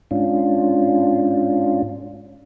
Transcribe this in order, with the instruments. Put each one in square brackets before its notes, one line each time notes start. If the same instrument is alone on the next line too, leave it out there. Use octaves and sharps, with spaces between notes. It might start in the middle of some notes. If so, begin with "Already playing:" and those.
[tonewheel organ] G#2 C#4 D4 F4